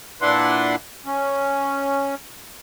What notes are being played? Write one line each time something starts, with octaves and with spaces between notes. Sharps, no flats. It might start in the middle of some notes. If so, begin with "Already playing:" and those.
A#2 D4 E4 B4 F#5 C6
C#4